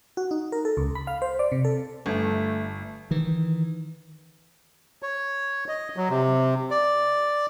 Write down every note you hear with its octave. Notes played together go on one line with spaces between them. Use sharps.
F#4
D#4
A#4
A4
C#2
B5
F5
C5
D5
C3
A4
G1 A3
D#3 E3
C#5
D#5
F#3
C3
D5